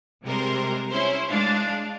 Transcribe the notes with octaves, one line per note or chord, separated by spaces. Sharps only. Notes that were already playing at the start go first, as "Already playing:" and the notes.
C3 G3 G#3 A#4 C5
C#4 E4 C5 C#5
G#3 D4 F5